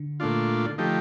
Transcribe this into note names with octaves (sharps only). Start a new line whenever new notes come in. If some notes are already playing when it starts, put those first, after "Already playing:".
Already playing: D3
A#2 A3 D4 F4
F3 A3 D#4 G4